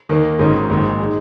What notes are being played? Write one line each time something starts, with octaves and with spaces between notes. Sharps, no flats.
D#2 D#3 A#3
G#1 G#2 D#3 C#4
A#1 G#2 D#3
G#3 D#4